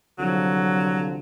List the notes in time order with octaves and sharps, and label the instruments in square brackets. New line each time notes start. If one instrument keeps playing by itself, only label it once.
[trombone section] C2 D3 F3 [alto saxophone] F#3